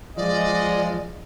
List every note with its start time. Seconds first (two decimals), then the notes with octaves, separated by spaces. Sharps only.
0.17 F3 G#3 D5 D#5